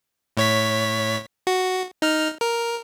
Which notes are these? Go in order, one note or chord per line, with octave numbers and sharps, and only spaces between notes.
A2 C#5 B6
F#4
D#4 F6
A#4